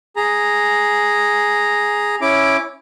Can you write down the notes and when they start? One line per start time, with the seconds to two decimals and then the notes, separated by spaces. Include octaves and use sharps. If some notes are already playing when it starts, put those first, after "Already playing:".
0.16 G#4 A#5
2.21 C#4 E4 D6